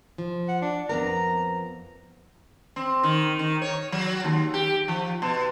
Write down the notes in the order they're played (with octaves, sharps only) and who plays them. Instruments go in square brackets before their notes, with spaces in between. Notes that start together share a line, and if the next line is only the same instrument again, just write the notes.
[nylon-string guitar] F3
[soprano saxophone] F#5
D4
[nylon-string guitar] F2 B3 A#4 [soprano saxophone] A#5
[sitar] C4
D#3
D#3
C#5
F#3
D#2
G4
F3
B2